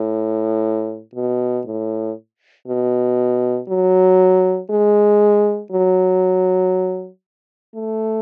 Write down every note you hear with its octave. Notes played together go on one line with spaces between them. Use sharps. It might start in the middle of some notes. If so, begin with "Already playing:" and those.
Already playing: A2
B2
A2
B2
F#3
G#3
F#3
A3